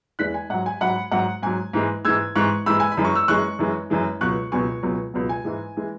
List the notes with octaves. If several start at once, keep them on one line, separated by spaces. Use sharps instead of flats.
E2 E3 G#3 F#6 B6
G#5
G#2 F#3 F#5
G#5
G#2 F#3 F#5 B5
G#2 F#3 F#5
G#2 F#3 G#5
G#2 E3 G#3
G#2 E3 G#3 E6 G#6
G#2 E3 G#3 C#6 F#6
G#2 E3 G#3 B5 E6
G#5
B5
F#2 E3 G#3
C#6
E6
F#2 E3 G#3 C#6 F#6
F#2 E3 G#3
F#2 E3 G#3
C#2 B2 F#3 C#6 F#6
C#2 B2 F#3 G#5 C#6
C#2 B2 F#3
C#2 B2 F#3
G#5
G#2 E3 G#3
E3 G#3